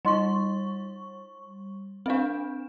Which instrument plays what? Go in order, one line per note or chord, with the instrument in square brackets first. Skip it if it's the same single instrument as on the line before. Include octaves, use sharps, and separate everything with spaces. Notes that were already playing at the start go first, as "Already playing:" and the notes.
[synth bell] G3 C#6 [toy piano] D#4 D#5 C6
[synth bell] C4 D4 [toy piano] B4 E5 F5